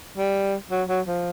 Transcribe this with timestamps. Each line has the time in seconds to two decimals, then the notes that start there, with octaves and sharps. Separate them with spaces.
0.18 G3
0.71 F#3
0.88 F#3
1.07 F3